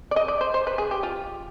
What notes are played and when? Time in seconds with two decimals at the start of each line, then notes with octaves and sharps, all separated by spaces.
0.11 D5
0.16 D#5
0.28 D5
0.41 C5
0.54 C5
0.67 B4
0.78 G#4
0.91 G4
1.03 F4